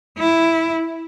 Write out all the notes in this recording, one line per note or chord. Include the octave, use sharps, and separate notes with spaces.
E4